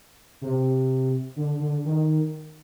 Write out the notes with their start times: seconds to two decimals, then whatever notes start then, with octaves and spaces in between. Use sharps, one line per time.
0.42 C3
1.36 D3
1.60 D3
1.85 D#3